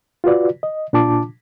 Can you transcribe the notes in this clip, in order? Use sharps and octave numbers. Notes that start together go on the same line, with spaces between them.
F4 F#4 B4 D5
D#5
A#2 D4 F4 A5 D6